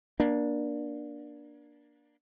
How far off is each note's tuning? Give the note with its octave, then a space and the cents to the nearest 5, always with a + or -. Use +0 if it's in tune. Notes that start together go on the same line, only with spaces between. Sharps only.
A#3 +30 D4 +0